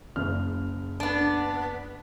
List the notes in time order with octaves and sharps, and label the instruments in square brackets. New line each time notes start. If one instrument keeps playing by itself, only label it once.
[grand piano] F#1 C#3 F6
[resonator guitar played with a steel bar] B3 D4